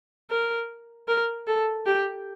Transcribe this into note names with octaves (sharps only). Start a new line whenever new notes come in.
A#4
A#4
A4
G4